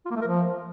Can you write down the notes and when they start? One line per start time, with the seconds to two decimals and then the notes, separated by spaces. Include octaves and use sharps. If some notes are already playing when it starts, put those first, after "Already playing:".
0.05 F4
0.11 A#3
0.16 A3
0.22 A#4
0.27 F3